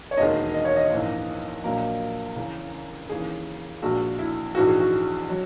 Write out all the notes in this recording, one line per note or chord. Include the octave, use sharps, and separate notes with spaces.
C#5
E1 D#2 D#3 G#3 D#5
D#5
C#5
D#5
A#1 G#2 E3 A#3
A#1 A#2 F#3 A#3 A#4
C#2 C#3 E3
D#2 C#3 E3 G#4
A#1 A#2 G#3 F#4
E4
A#1 G#2 E3 F#4
G#4
F#4
F#3